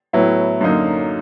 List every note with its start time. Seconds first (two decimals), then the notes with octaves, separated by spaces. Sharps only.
0.13 A2 F#3 B3 E4
0.61 F#2 D3 F#3 A#3 D#4